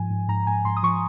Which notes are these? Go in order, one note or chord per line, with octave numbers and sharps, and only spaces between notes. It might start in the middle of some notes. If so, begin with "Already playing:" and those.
Already playing: G#2 F3 G#5
G#2
G#2 A#5
G#2 G#5
G#2 C6
D#6
F3 C#6